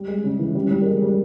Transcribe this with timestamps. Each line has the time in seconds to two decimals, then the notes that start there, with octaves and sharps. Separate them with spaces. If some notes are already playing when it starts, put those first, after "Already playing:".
Already playing: G3
0.08 G#3
0.24 C#3
0.39 E3
0.55 G3
0.71 G3
0.81 A#3
0.86 G#3
1.02 G3